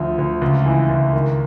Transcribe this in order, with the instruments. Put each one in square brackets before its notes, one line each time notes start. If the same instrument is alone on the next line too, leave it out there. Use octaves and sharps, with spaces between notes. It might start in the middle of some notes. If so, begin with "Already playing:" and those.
Already playing: [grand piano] D2 F3
D2
C#2
E3
C#2
D#3